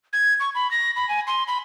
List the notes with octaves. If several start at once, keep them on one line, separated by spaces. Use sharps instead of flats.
G#6
C#6
B5
A#6
B5
G#5
C6
B5